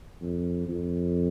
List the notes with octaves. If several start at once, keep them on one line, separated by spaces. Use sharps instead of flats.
F2
F2